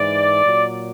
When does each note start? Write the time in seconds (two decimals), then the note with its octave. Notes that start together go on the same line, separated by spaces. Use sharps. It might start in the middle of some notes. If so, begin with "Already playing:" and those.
Already playing: G#2 E3 D5
0.43 A#2 F#3